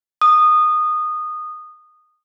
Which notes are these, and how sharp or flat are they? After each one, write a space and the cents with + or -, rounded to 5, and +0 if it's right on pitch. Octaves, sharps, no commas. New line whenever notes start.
D#6 -15